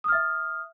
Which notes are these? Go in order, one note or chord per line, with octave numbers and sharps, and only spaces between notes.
E5 D#6 F6